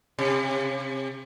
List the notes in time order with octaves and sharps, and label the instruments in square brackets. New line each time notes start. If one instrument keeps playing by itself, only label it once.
[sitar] C3